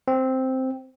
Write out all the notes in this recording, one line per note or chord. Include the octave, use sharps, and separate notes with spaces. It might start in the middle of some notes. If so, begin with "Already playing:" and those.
C4